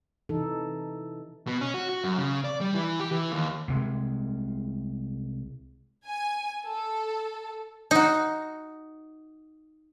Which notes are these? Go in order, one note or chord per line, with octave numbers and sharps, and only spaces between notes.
C3 E3 D#4 A4
B2
C#4
F#4
F#4
F#2
C#3
D5
G3
E3
G4
E3
D#2
C2 C3 G#3
G#5
A4
D#4 F#4